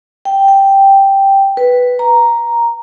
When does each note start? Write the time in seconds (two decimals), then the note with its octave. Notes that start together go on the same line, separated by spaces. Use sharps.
0.25 G5
0.48 G5
1.57 B4
1.99 A#5